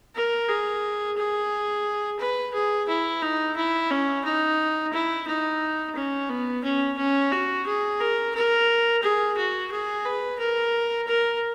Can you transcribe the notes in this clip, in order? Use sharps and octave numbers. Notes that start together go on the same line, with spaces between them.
A#4
G#4
G#4
B4
G#4
E4
D#4
E4
C#4
D#4
E4
D#4
C#4
B3
C#4
C#4
F#4
G#4
A#4
A#4
G#4
F#4
G#4
B4
A#4
A#4